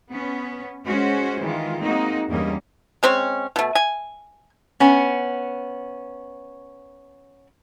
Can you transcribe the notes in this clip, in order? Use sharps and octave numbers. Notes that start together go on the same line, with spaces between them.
B3 C#4
G#3 C#4 F#4 C5
D#3 E3 G#3 F4
G#3 A#3 C4 D#4 F#4 D#5
E2 G2 G3 A#3 C#4 D#5
G#3 C4 C#4 C#5
B2 A3
G#5
B3 C#4